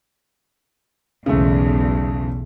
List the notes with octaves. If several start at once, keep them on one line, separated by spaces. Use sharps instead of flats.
B1 E2 C#3 G#3 A3